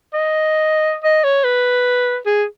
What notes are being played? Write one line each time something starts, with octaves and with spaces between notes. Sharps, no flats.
D#5
D#5
C#5
B4
G#4